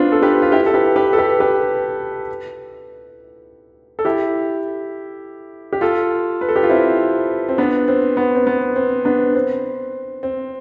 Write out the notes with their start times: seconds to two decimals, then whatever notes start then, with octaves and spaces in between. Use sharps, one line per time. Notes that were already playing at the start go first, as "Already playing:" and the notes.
Already playing: B3 C4 D4 F4
0.12 A4
0.22 G4 B4
0.42 F4
0.52 E4 G4
0.66 A4
0.74 G4 B4
0.96 G4 B4
1.13 A4
1.18 G4 B4
1.40 G4 B4
3.99 A4
4.05 E4 G4
5.73 G4
5.81 F4 A4
6.41 B4
6.48 A4
6.56 G4
6.63 F4
6.70 C4 E4
7.49 C4
7.58 B3 D4
7.88 C4
8.17 B3
8.35 C4
8.47 B3
8.76 C4
9.05 B3 D4
9.35 C4
10.23 C4